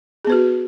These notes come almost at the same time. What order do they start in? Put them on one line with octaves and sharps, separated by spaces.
G#4 B3 B4 F#4